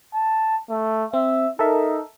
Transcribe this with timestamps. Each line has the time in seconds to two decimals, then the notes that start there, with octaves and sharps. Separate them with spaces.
0.15 A5
0.70 A3
1.13 C4 E5
1.59 D#4 A4 A#4 E5